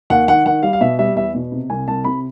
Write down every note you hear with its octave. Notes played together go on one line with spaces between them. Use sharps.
D#2 F#5
D#3 F#5
D#3 F#5
G3 F5
F5
B2 E5
G3 E5
E2 E5
B2
C3
C2 G#5
C2 A5
C3 B5